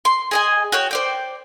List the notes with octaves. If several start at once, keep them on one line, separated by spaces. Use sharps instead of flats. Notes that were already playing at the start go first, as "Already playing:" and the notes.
C6
G#4 D#5 G#5
F#4 C#5 G5
C5 D5 G5